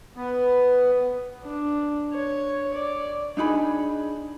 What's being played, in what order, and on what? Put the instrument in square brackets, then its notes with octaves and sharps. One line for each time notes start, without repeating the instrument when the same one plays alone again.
[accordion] B3
[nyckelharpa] D4
C#5
D5
[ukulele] D4 D#4 G#4 B5